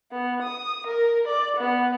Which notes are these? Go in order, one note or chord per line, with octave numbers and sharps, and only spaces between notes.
B3
D#6
A#4
D5
B3